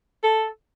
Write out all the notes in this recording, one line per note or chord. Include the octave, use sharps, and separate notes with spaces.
A4